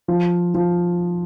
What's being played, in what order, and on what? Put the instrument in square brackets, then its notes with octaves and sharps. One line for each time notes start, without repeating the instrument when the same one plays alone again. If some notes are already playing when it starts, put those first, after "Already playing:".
[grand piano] F3
F3